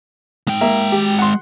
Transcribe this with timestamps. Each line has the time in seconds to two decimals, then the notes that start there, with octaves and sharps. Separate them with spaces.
0.48 G#3 G5
0.61 A#3 E5
0.92 G4
1.19 F#5 C6